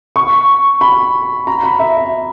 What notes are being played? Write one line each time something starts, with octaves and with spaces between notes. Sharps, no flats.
C#6
B5
A#5
B5
E5
E5